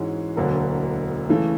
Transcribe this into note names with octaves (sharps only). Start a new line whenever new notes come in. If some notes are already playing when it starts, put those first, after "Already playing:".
Already playing: G#2 E3 G#3 C#4 F#4
E1 D2 D3 F#3 A#3
C#3 E3 A3